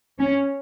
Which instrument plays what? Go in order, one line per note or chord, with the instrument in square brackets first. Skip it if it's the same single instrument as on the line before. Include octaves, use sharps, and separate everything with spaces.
[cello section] C#4